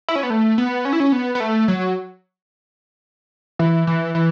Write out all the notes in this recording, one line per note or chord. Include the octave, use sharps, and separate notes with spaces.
E4
C#4
B3
A3
B3
C#4
E4
C#4
B3
B3
A3
F#3
E3
E3
E3